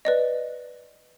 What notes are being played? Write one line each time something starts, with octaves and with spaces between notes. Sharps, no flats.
B4 D5 D#5